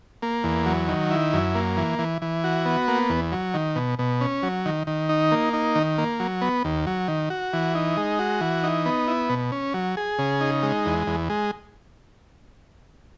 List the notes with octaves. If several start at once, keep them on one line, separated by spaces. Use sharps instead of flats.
A#3
E2
F#3
D#3
E4
F#2
A#3
E3
E3
E3
F#4
B3
A#3
E2
F#3
D#3
B2
B2
C#4
F#3
D#3
D#3
D#4
A#3
D#4
D#3
A#3
F#3
B3
D#2
F#3
D#3
F#4
E3
D#4
G#3
F#4
E3
D#4
B3
E4
B2
C#4
F#3
G#4
C#3
D#4
G#3
E2
E2
G#3